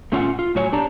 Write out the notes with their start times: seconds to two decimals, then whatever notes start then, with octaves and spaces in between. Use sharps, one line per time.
0.12 A3 C#4 F4 D#5 F#5
0.39 F4
0.55 A2 F#3 C#5 F#5 G#5
0.73 D4 G4 D5 A5 A#5